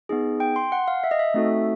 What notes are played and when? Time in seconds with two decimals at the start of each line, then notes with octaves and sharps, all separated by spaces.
0.09 B3 D#4 G#4
0.40 G5
0.56 C6
0.72 F#5
0.88 F5
1.04 E5
1.11 D#5
1.19 E5
1.34 A3 C4 D#4 F#4 A4